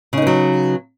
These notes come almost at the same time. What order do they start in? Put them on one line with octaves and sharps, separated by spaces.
C#3 D#4 B3 F#3